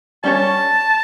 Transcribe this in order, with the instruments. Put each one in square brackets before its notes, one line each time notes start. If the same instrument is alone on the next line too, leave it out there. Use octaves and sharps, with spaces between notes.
[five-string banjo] G3 C#4 G4 C#5 [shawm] A5